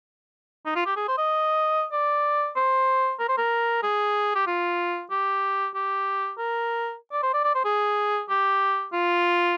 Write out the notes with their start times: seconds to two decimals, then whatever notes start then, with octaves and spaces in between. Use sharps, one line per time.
0.65 D#4
0.75 F4
0.86 G4
0.96 G#4
1.08 C5
1.18 D#5
1.92 D5
2.56 C5
3.20 A#4
3.28 C5
3.38 A#4
3.83 G#4
4.35 G4
4.47 F4
5.10 G4
5.74 G4
6.38 A#4
7.12 D5
7.23 C5
7.34 D5
7.44 D5
7.55 C5
7.65 G#4
8.29 G4
8.93 F4